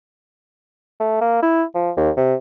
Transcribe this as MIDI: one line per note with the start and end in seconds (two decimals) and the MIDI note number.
1.00 1.16 57
1.21 1.38 58
1.43 1.63 64
1.75 1.91 53
1.97 2.10 39
2.17 2.34 48